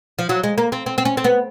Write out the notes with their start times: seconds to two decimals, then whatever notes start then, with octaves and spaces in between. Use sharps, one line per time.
0.19 F3
0.29 F#3
0.44 G#3
0.58 A#3
0.72 C4
0.86 C4
0.98 C4
1.05 C#4
1.17 C4
1.24 B3